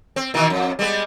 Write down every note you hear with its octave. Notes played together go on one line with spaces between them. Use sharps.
C4
B2 D#3 E3
F2
G3 G#3 B3